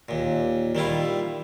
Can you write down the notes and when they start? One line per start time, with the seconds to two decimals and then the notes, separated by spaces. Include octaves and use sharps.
0.09 D#2 A#2
0.75 D#3 G3 E4 F4